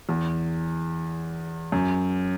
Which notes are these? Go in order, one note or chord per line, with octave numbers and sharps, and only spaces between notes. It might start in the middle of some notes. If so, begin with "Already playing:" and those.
E2
F#2